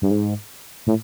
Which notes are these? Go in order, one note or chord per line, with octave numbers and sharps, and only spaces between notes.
G2
G#2
A2